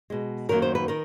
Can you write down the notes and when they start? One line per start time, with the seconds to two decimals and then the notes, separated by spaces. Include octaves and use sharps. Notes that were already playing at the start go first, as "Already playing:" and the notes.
0.10 B2 G#3
0.49 F#2 D#3 F#3 A#3 A#4
0.62 C5
0.75 B4
0.88 D#3 A#4